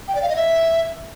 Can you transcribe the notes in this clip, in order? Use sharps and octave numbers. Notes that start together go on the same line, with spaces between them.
G5
D5
F5
D#5
E5